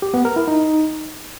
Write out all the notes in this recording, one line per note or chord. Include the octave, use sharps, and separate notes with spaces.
G4
B3
A#4
E4
D#4